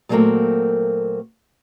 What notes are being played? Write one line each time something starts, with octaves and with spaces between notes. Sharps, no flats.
A#2 F#3 G3 A3 A#3 C4